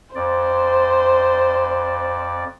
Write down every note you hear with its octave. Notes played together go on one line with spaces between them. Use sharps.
F2 C5 D5